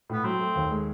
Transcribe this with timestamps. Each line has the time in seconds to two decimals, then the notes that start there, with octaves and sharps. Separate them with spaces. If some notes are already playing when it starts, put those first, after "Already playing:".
0.10 A2 B3
0.24 F#3 C4
0.40 A3
0.56 D#2
0.71 G#3